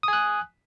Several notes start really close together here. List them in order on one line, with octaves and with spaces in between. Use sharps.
D#6 G#5 F#6